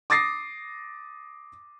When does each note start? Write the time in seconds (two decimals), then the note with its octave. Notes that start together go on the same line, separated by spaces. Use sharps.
0.10 D6 D#6 A6 A#6 C7